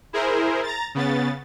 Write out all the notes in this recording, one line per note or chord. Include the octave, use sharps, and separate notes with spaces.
E4 G#4 A#4 C5
A#5 A6
C#3 B3 A6